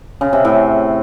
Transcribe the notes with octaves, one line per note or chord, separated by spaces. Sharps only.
C#3
C3
A2